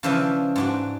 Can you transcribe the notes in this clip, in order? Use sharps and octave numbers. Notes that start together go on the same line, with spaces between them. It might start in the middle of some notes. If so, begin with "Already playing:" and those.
C#3 E3 F3 D4 E5 G#5
G#2 D4 F#4